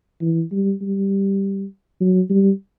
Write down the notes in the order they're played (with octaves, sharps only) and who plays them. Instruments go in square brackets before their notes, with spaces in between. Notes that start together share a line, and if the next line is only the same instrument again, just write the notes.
[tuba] E3
G3
G3
F#3
G3